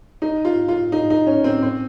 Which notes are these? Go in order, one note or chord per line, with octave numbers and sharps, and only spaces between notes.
D#4
F4
F4
D#4
D#4
C#4
C4
C4